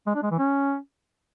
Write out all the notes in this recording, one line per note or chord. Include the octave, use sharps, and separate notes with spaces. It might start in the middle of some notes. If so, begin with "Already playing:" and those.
G#3
D4
G#3
E3
C#4